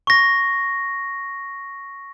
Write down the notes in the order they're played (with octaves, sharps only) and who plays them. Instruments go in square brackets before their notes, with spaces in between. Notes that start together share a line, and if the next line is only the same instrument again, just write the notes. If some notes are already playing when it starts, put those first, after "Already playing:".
[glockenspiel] C#6 A#6